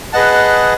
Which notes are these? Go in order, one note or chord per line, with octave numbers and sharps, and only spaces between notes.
G#4 B4 D#5 F#5 A5